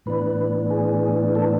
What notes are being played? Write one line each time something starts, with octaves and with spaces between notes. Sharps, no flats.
A2 E3 B3 D4 B4
G#4
A4